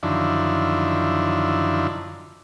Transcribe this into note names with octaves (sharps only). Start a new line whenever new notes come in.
F#2 D3 D#3 F3 D4 E4